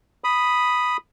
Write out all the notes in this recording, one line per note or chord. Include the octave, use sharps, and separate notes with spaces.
B5 D#6